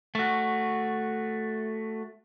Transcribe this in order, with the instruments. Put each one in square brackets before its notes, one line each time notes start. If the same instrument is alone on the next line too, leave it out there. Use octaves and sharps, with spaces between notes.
[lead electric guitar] A3 F#4